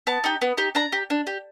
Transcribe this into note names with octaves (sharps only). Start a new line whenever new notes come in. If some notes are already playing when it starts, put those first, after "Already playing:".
B3 A5
D#4 G4
B3
D#4 G4
D4 A#5
G4
D4
G4